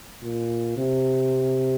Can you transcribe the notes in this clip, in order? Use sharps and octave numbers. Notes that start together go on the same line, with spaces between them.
A#2
C3